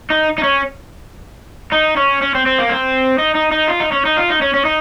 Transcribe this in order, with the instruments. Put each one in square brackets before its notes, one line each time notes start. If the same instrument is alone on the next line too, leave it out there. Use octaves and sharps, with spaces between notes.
[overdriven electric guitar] D#4
D#4
C#4
D#4
C#4
C#4
C4
C4
A#3
C4
D#4
D#4
D#4
F4
D#4
C#4
D#4
F4
D#4
C#4
C#4
D#4